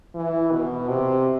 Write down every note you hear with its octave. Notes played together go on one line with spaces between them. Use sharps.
E3
B2
C3